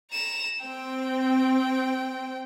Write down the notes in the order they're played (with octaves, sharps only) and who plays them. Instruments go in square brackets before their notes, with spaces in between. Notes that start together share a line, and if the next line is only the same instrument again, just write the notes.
[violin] A#5 E7
[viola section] C4 [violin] G5